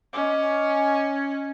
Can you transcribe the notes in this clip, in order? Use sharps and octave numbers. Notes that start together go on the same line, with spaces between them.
C#4 D#5 D6